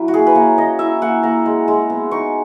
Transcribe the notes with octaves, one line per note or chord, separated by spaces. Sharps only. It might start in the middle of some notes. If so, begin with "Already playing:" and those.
Already playing: F#3 C#4 E4
F#4
A#3 G#4
B4
A#3 C#5
C#4 D#5
E4 E5
A#3 F#5
A#3 A#5
G#3
G#3
B3
D#4 C#6